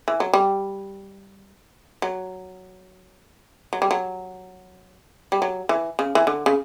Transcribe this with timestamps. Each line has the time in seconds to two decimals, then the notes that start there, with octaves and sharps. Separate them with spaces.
0.08 E3
0.20 F#3
0.33 G3
2.02 F#3
3.73 F#3
3.82 G3
3.91 F#3
5.32 G3
5.42 F#3
5.69 E3
5.99 C#3
6.15 E3
6.27 D3
6.46 C#3